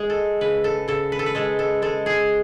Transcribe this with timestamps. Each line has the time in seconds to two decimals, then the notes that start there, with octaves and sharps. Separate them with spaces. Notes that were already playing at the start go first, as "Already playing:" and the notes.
Already playing: G#3
0.10 A4
0.41 C#3 B4
0.64 A4
0.88 C#3 A4
1.12 B4
1.19 A4
1.26 B4
1.35 G#3 A4
1.59 A4
1.82 G#3 A4
2.06 G#4